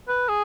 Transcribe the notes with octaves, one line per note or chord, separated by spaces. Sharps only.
B4
G#4